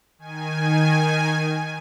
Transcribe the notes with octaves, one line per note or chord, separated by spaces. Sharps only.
D#3 G#5